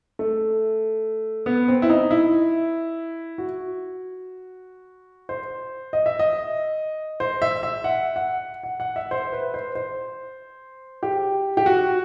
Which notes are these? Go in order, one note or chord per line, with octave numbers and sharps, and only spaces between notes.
A3
B3
C4
E4
D#4
E4
F#4
C5
D#5
E5
D#5
C5
E5
E5
F#5
F#5
F#5
F#5
E5
C5
B4
C5
C5
G4
G4
F#4